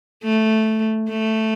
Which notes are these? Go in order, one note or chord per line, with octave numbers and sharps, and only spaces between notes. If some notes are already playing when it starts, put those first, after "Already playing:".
A3
A3